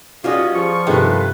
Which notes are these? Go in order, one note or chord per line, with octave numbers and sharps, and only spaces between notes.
G3 B3 C#4 F4 F#4 G#4 D5 D#5
F3 G#4 C#6
G1 C3 D#3 G#3 A3 B4 G5